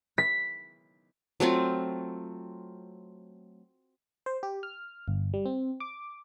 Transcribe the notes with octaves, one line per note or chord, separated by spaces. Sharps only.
B6
F#3 A3 C4 F4
C5
G4
F6
G1
G3
C4
D6